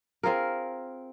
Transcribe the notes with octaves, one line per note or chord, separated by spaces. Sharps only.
C4 F4 G#4 A#4